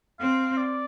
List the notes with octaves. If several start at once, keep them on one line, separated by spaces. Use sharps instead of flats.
C4 F5
D5